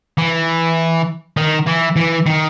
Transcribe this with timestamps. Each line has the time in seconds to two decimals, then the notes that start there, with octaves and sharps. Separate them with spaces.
0.18 E3
1.37 D#3
1.67 E3
1.96 E3
2.26 D#3